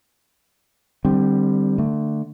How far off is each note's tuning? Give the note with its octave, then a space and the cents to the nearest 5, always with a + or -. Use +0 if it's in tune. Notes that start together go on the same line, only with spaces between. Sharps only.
D3 +35 G3 +0 C4 +0
D3 +25 A3 +25